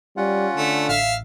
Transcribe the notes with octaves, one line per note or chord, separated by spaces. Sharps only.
G3 C#4 F4 F#5
D3 A3
A1 E5 F5